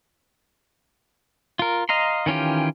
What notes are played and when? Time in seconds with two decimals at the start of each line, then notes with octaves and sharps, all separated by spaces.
1.59 F4 A#4
1.89 D#5 F5 A#5 C6
2.26 D#3 E3 C#4 F4 G4